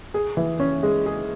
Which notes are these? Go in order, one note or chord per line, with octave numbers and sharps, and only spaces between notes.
G#4
E3
C#4
G#3
G#4